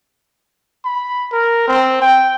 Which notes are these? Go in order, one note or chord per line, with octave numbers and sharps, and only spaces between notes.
B5
A#4
C4
G5